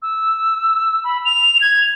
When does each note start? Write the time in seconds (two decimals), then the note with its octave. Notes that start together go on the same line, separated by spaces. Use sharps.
0.02 E6
1.04 B5
1.25 F7
1.61 G#6